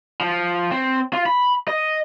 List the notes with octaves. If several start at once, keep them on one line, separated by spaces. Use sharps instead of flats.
F3
C4
F4
B5
D#5